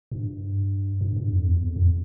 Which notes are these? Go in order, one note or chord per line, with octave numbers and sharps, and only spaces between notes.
G2
G2
G2
F2
E2
F2
F2